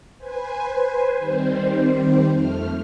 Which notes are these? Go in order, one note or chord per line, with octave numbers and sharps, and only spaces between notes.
B4 C5 G#5
D#3 G3 C4 C5
F2 A3 F6